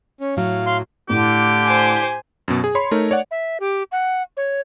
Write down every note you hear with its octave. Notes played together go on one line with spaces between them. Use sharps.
C#4
A2 F#3 F5
F5 C6
A2 D3 G4
C5 G#5
F#2 B2
G#4
C#5 B5 C6
A3 D#4 A#4 C#5
C#5 D5 F#5
E5
G4
F#5
C#5